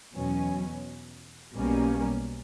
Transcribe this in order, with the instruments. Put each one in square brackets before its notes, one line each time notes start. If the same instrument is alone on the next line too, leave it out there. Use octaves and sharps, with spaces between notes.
[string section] E2 B2 F#3 C#4
B1 B2 G3 A#3 C#4